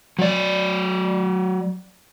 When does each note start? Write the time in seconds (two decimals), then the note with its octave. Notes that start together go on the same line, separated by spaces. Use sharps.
0.19 F#3 D5